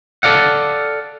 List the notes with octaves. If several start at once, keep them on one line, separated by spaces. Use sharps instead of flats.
A4 D5 F5 F#5